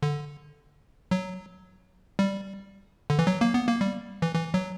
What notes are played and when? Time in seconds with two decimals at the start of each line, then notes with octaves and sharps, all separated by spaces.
0.02 D3
1.11 F#3
2.19 G3
3.10 D3
3.19 E3
3.27 F#3
3.41 A#3
3.54 B3
3.68 A#3
3.81 G3
4.22 E3
4.35 E3
4.54 F#3